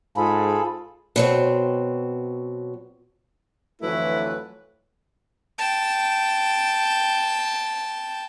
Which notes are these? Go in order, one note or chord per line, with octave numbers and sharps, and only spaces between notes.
G#2 F4 G#4 A4 B5
B2 F#3 C4
F2 D3 E3 F#3 A3 E4 B4
G5 A5